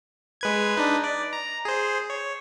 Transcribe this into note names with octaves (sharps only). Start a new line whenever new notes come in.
G#3 B4 G#6
D4 D#4 B4
D5
A#5
G#4 C5
C#5